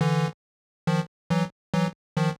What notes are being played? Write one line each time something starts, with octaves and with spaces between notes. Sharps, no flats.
D3 E3
D#3 F3
E3 F#3
E3 F#3
D#3 F3